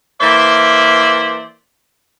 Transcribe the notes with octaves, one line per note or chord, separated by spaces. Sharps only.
E3 A#3 C5 D5 E5